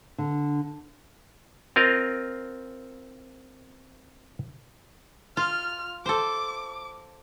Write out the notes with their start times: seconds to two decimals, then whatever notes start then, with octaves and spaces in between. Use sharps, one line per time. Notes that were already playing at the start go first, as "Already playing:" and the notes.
0.18 D3
1.76 C4 F4 A#4 D#5 F5
5.37 F4 F6
6.06 A4 C5 D6